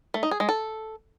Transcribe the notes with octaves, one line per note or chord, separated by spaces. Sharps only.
A3
D#4
G#4
G#3
A4